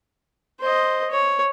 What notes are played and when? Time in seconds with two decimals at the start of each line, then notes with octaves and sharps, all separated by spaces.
0.60 C5 D#5
1.11 C#5